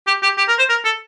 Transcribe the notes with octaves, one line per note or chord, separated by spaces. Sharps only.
G4
G4
G4
A#4
C5
A#4
A4